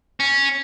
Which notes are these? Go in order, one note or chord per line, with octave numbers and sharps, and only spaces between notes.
C#4